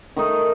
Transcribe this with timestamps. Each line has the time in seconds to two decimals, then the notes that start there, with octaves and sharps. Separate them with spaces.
0.16 D#3 A3 D#4 A4